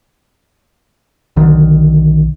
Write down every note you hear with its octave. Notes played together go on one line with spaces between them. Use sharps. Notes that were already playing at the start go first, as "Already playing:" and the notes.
B1 D3 D#3